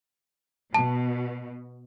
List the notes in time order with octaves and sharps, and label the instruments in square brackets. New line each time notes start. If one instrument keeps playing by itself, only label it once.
[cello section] B2 [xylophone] A5